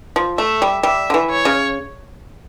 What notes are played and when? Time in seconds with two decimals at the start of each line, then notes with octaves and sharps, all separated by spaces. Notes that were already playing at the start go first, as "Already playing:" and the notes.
0.16 F3
0.38 A3 E5
0.62 G3
0.83 G3 E5
1.10 D3
1.14 E3
1.30 C#5
1.45 C#3